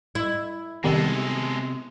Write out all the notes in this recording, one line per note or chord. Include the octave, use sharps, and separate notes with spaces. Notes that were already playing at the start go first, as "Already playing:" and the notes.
E4
C3 D#3 G3 G#3 B3 A4